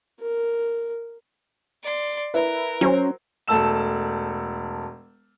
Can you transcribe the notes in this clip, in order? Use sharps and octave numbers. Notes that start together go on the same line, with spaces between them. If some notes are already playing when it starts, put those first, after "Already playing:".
A#4
D5 C6
E4 A#4 B4
F#3 C#4 C5
E1 A3 A5 E6 E7